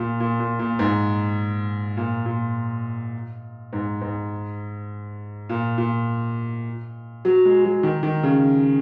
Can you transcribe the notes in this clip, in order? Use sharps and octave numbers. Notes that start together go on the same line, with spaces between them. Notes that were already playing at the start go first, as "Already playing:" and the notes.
Already playing: A#2
A#2
A#2
A#2
G#2
A#2
A#2
G#2
G#2
A#2
A#2
F#3
G#3
F#3
D#3
D#3
C#3